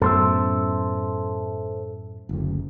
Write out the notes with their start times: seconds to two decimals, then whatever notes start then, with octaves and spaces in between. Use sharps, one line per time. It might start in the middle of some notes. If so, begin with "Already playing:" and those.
0.02 F#2 A2 B3 A4 C5 E5
2.29 F#1 D2